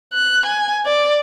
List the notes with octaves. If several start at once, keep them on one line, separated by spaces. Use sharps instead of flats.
F#6
G#5
D5